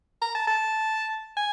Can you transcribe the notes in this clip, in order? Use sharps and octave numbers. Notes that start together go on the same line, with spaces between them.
A#5
A5
A5
G#5